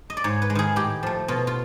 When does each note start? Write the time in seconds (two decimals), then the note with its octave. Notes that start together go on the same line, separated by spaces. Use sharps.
0.10 D#5
0.17 D5
0.24 G#2 C#5
0.42 B4
0.50 G#3
0.55 D#3 G#4
0.76 A2 G4
1.03 F3 A3
1.28 B2 F4
1.47 F4